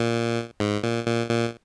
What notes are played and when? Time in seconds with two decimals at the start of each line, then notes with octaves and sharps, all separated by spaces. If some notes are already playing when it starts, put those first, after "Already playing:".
Already playing: A#2
0.60 G#2
0.83 A#2
1.06 A#2
1.29 A#2